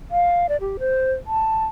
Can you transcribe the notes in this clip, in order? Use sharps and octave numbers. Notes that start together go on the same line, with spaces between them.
F5
D5
G4
C5
A5